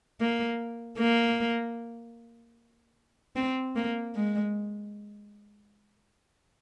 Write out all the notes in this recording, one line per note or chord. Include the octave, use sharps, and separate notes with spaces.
A#3
A#3
C4
A#3
G#3